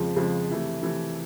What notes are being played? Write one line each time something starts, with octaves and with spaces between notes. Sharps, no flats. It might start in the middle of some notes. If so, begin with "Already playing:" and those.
Already playing: F2 C#3 F3 G#3
F2 C#3 F3 G#3
C3 E3 A3
C3 E3 A3